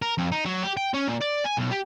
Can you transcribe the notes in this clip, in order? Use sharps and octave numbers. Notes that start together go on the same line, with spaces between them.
A#4
F2
D#4
F#3
G4
G5
C#4
A#2
D5
G#5
B1
G4